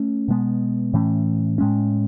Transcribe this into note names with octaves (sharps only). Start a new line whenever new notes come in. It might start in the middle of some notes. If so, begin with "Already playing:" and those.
Already playing: A3 C#4
B2 G#3 B3
A2 E3 A3 C#4
A2 G#3 C#4